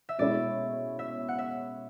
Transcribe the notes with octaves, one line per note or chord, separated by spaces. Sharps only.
E5
B2 G#3 C#4 E4 D5
E5
F#5
E5